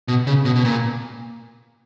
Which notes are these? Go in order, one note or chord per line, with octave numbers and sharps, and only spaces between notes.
B2
C#3
B2
B2
A#2